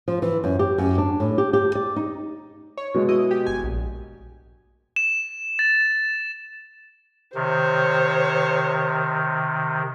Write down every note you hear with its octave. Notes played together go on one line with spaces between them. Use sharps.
F3
E3
F#2
G4
F#2
D4
A2
G4
G4
D5
D#4
C#5
B2 G#3
E4 D#5 D#6
G4
G1 G#5
A#1
E7
A6
C3 D#3 C5 C#5